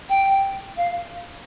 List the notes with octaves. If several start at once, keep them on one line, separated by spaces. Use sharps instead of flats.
G5
F5